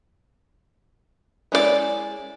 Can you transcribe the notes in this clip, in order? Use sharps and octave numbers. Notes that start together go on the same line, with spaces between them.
G#3 C#4 E4 F4 D5